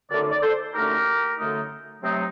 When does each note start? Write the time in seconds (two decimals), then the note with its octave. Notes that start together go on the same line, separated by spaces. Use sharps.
0.09 F#2 D3 A3 D#4 A#4 D5
0.31 D5
0.42 A4 C5
0.73 F#2 D3 A3 D#4 G4 A#4
1.38 F#2 D3 A3 D#4
2.02 C3 F#3 A3 C4 D#4